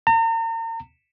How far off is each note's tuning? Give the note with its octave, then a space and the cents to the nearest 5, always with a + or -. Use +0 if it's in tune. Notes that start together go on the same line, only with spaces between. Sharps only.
A#5 -40